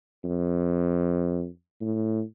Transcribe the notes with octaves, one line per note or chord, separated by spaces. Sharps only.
F2
A2